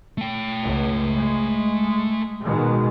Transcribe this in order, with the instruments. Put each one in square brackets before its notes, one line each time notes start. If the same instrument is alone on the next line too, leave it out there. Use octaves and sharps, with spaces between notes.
[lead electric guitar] A3 G5
[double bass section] C#2
G#3
B2 D#3 G#3